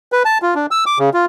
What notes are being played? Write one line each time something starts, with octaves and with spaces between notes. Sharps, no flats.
B4
A5
F4
D4
E6
D6
C#3
F4